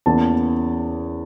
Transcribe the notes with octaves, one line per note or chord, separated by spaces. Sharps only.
E2 E3 A#3 C#4 A5